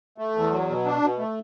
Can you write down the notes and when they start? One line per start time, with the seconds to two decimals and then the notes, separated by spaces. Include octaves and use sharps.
0.18 A3
0.35 E2
0.51 F#3
0.69 B2
0.85 D4
1.02 B2
1.19 A3